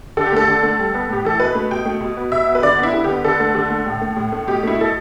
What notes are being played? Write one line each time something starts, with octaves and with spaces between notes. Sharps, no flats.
D3 A4
G4
A3 A4
D3
A3
G3
B3
A2 G4
E3 A4
B2 B4
A3
B2 G5
A3
B2
B3
B2 E5
B3
B4
D3 D5
B3 E4
D3
B3 G4
D3 A4
A3
D3
A3
A2
A3
A2
A3
B2 G4
A3 E4
B2 A4